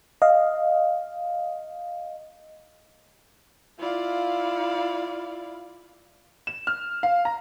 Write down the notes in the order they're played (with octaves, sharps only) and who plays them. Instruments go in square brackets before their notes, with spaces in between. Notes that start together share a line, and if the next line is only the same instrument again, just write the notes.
[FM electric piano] D#5 F5
[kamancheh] E4 F5 [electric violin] F4 D5
[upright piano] E7
F6
F5
A#5